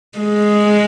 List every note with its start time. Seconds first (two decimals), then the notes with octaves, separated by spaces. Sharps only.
0.18 G#3